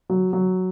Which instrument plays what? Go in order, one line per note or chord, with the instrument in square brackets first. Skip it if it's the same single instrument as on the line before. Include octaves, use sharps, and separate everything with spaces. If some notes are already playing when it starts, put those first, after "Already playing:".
[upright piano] F#3
F#3